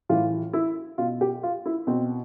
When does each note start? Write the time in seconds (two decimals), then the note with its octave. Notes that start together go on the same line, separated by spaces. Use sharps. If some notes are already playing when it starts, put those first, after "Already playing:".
0.09 A2 E3 F4
0.54 E4
0.98 B2 F4
1.21 G4
1.43 F4
1.66 E4
1.87 B2 C4